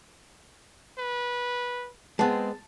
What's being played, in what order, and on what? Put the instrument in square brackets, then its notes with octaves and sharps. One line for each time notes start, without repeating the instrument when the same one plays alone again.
[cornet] B4
[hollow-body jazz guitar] G#3 B3 [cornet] C4 [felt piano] A5